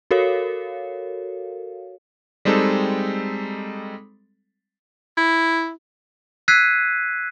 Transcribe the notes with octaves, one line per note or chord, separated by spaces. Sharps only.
F#4 A4 A#4 C#5 F5
G3 G#3 C4 D#4 A4
E4
E6 F#6 G#6 B6 C7 D#7